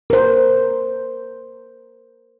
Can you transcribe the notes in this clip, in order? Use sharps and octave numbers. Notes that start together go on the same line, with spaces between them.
A#4 C5